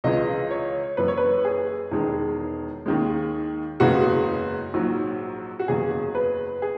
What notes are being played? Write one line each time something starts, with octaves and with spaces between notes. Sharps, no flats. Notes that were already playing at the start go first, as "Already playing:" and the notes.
C#2 C#3 E3 G#3 D#5
C#5
F#1 F#2 E3 B4
C#5
B4
G#4
E1 E2 D#3 G#3
D#2 D#3 G#3
F#1 E2 C#3 E3 G#3 F#4
A#1 G#2 F#3
F#4
F#1 E2 C#3 F#3 G#4
B4
G#4